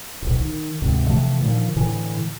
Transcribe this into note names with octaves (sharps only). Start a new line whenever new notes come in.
D1 B1
D#3
D2 G#2 C3
C3 E3 F3 A3
A#2 D3 D#3 F3
A2 D3 E3